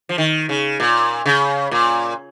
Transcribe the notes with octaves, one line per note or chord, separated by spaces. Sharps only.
F3
D#3
C#3
A#2
C#3
A#2